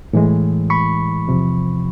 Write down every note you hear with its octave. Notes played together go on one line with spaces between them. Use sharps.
A2 E3 G#3
B5 C#6
E2 C3 F3